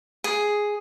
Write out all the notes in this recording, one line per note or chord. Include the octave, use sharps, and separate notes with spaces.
G#4